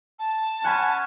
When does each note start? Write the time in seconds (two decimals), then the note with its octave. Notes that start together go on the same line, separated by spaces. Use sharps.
0.19 A5
0.64 C#4 F#5 G#5 B5